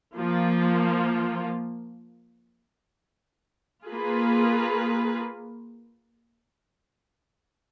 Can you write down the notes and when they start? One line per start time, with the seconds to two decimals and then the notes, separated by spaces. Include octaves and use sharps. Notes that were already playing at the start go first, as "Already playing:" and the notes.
0.14 F3 A#3 F4
3.87 A#3 F4 G#4 B4